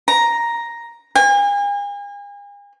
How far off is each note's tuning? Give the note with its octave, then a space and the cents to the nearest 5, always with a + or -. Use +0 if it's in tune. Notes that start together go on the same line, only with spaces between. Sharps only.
A#5 +5
G#5 -40